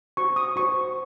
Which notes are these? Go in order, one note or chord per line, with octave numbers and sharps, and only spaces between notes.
F#4 C5 C#6
D#6
F#4 C5 C#6